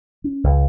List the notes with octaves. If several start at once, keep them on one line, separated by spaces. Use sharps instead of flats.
C#4
C#2